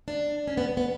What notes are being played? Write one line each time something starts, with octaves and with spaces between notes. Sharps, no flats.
D4
C#4
B3
B3